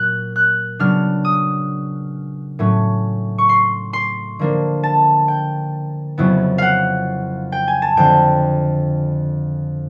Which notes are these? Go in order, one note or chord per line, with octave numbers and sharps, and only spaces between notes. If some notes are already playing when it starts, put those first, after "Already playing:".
Already playing: A#2 F#3 F#6
F#6
C#3 F#3 B3 D4 F6
D#6
A2 F#3 A3 C#4
C#6
C6
C6
D3 F3 A#3 D4
A5
G5
F2 C#3 F#3 B3 E4
F5 F#5
G5
G#5
A5
F2 D3 F3 G5